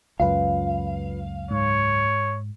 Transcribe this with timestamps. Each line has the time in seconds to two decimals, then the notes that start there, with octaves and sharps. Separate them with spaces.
0.20 C#2 F#2 F4 B4 F5
1.51 G#2 C#5